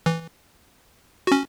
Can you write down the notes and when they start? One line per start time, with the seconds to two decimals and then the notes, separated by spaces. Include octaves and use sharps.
0.06 E3
1.27 C#4 F#4